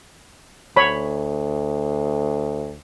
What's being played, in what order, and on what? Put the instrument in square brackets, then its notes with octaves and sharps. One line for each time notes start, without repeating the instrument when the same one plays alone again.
[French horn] D2 [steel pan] C#5 B5